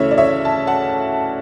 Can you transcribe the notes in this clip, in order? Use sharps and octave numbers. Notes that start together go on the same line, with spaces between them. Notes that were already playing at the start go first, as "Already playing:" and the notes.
Already playing: D2 C#3 E3 A3 C#5 E5
D5
C#5 E5
A5
F#5 A5